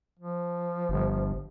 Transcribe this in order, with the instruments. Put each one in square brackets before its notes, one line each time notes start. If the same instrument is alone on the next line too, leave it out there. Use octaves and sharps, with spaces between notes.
[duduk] F3
[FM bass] G1